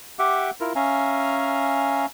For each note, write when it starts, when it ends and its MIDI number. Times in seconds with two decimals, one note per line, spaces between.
0.19 0.51 67
0.19 0.51 76
0.19 0.51 78
0.19 0.51 86
0.60 0.73 64
0.60 0.73 65
0.60 0.73 70
0.76 2.06 61
0.76 2.06 76
0.76 2.06 77
0.76 2.06 80
0.76 2.06 82